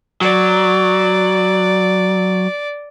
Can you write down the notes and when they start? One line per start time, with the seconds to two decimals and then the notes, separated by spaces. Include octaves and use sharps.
0.21 F#3 D5